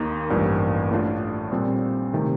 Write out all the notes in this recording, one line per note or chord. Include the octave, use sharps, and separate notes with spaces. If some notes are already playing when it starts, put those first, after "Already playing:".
Already playing: D#2 D#3 A#3 D#4
A1 G2 F3 A#3
A2 A3 D4 F4
A#2 G3 C4
C3 D#3 A3